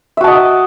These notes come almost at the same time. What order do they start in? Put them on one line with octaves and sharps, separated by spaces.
E5 F#4 A5 D#5